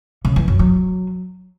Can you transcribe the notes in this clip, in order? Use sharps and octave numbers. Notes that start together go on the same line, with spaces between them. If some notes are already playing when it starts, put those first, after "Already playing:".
C#3
E3
F#2
F#3